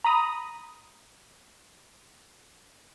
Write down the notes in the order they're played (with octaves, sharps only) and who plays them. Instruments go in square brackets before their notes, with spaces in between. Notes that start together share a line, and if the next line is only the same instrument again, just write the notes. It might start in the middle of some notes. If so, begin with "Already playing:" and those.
[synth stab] A#5 B5 D#6